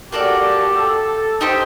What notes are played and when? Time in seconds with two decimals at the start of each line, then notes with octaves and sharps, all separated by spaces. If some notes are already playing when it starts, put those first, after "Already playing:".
0.12 A#3 F#4 G4 A4 D5
0.76 A4
1.41 D#4 G4 C5